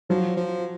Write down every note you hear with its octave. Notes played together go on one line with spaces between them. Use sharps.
F3 F#3
F3